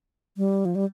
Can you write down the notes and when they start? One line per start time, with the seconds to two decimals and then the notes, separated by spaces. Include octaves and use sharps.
0.37 G3
0.65 F3
0.75 G3